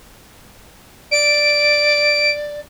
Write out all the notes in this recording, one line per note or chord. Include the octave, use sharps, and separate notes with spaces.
D5 D7